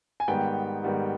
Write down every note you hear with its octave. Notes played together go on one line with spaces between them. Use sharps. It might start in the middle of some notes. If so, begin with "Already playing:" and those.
G#5
G#2 D#3 G3 B3 G5
G#2 D#3 G3 B3